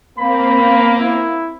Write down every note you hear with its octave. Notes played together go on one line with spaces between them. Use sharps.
A#3 C4 B5
E4